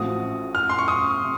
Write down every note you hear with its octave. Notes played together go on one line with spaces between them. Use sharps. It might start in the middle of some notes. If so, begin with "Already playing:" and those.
Already playing: A1 A2 F3 C4 F#4 D#6
F6
C6
C#6
D#6
C3